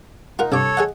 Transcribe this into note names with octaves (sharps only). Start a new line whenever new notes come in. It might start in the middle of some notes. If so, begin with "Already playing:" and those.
D#4 F4 A#4 F#5
C2 G2 A4 C#5 D6
G#4 D#5 F#5